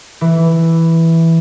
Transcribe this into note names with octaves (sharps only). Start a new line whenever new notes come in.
E3